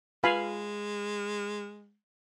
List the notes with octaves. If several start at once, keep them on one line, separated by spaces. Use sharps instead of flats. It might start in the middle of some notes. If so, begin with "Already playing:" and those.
G#3 F4 B4 F5 G#5 B5